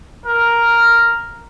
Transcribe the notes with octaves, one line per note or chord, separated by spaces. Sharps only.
A#4